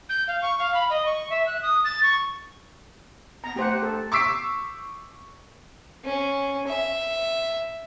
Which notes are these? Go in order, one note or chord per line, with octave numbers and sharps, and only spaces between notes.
G6
F5
C#6
F5
B5
D#5
C#6
E5
F#6
D#6
A6
C#6
B3 A#5
A3 G4 C5 F#5
A4
C#6 D6 E6 B6 C7 D7
C#4
E5